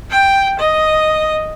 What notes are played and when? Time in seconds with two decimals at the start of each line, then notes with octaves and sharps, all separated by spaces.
0.10 G5
0.59 D#5